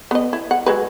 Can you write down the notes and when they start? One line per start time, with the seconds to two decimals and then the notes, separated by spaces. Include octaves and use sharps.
0.11 B3 D#5
0.33 E4
0.51 F#5
0.66 F#3 G#3 B4